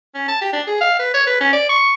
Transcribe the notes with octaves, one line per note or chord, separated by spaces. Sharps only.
C#4
A5
G4
D4
G#4
F5
B4
C#5
B4
C#4
D5
C#6